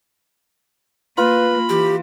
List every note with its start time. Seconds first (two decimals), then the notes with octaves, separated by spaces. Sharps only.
1.18 A#3 F4 B4 B5
1.69 E3 G4